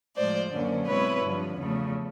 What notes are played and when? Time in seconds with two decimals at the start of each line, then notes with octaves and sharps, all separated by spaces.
0.16 A2 F3 G#3 C5 D5
0.52 F#2 D3 F#3 A#3 C#4
0.87 B2 G#3 C4 E4 B4 C#5
1.22 G2 D3 F3
1.58 E2 C#3 F3 A3